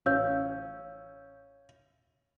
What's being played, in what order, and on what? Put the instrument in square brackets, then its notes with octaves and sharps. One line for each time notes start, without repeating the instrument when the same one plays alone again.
[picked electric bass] A1 [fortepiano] C#4 [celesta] F5 E6 G6